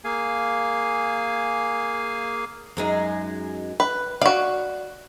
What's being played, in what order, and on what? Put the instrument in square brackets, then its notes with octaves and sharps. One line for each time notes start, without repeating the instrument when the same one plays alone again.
[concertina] A#3 G#4 F5 G#5
[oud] F#2 G#3 D#4
[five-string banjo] B4
[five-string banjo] F#4 F5 [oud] D5